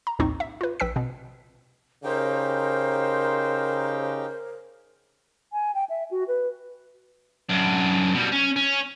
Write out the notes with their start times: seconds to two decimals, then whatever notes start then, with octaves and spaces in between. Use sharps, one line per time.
0.07 A#5
0.19 A#1 D#2 A2 C4 D#4 C#6
0.40 E5
0.61 F4 B4
0.80 A#1 B4 G5 E6 B6
0.96 B2 C4
2.04 C#3 D#4 G4 A#4 C5 G5
5.53 G#5
5.75 G5
5.89 E5
6.11 F#4
6.28 B4
7.49 F#2 D4
8.14 B2 G3
8.32 C#4
8.56 C#4